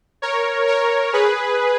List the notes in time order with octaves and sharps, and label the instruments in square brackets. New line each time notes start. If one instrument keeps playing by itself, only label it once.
[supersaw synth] A#4 C#5
A#4 C#5
G#4 B4